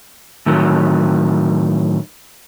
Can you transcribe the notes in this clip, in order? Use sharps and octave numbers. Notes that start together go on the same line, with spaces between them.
A2 D#3 F#3